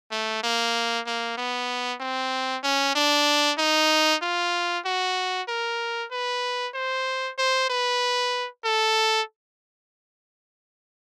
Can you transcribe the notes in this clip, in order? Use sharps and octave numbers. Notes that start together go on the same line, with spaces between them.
A3
A#3
A#3
B3
C4
C#4
D4
D#4
F4
F#4
A#4
B4
C5
C5
B4
A4